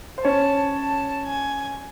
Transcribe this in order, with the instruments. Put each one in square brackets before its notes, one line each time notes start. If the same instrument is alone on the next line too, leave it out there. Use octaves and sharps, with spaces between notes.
[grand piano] C5
[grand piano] C#4 C#5 [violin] A5
[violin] A5
G#5